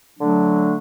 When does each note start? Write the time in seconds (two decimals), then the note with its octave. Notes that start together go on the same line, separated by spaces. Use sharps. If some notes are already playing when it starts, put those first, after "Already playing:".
0.20 D3 F#3 A3 D4